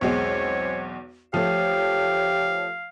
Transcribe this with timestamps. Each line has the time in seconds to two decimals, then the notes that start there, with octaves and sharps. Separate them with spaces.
0.01 B1 E2 G#3 C4 C#5
1.34 F3 A3 G4 C#5 F5